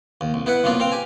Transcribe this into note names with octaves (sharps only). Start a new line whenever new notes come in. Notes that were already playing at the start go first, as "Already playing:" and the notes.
D#2
C2
B3 E4 B4 F#5
C2 F#2 A#3 B3 F4
C4 F5 G5
G4 G#5